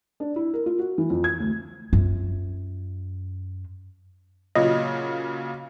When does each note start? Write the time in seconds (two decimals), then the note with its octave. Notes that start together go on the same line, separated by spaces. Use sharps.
0.20 D4
0.36 E4
0.54 A#4
0.66 F4
0.79 F#4
0.98 E3
1.10 F2
1.24 G#6
1.40 D2
1.93 F#2 F4
4.55 A#2 C#3 F#3 D#5